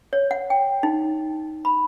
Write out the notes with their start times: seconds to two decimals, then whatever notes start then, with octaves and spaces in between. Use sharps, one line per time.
0.13 C#5
0.31 F#5
0.50 G5
0.83 D#4
1.65 B5